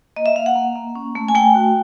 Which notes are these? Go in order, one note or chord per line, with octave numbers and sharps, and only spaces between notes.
A#3 D#5
E5
A#3 F5
F#5
A#3
A#3
C#4
A3
G#5
A3 G5
F#4